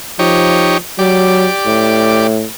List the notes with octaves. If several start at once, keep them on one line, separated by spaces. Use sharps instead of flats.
F3 D#4 G4 C#5
F#3 G4 D5
A2